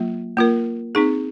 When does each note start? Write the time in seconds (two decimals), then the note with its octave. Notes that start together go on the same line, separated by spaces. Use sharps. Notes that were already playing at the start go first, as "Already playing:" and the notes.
Already playing: F#3 A#3 F4
0.37 A#3 F4 A#4
0.95 C4 D#4 G#4